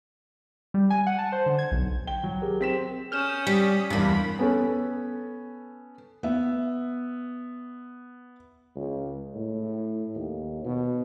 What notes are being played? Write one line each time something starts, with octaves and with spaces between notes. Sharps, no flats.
G3
G#5
F#5
A5
C5
D3
G#6
B1
G5 G7
F#3
G4 G#4 A#4
C4 B6 E7
C#4 D#6 F6 G6 E7
G3 B6
E2 G2 C3 A#3 B5
B3 C#4 A4
B3 E5
C#2
A2
D#2
B2